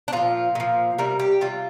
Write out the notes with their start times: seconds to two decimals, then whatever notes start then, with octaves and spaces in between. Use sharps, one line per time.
0.08 D4
0.13 A#2 F3 F4
0.55 A#2 F3
0.98 C3 G3 A#4
1.20 G4
1.41 C3 G3 F4